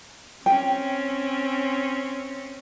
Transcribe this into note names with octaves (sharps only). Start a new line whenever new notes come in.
C4 C#4 G5